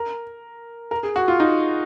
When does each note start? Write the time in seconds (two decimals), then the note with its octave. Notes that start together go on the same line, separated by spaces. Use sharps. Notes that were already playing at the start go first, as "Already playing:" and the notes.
Already playing: A#4
0.91 A#4
1.03 G#4
1.16 F#4
1.28 F4
1.40 D#4